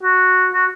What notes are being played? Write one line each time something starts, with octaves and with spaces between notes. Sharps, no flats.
F#4
F#4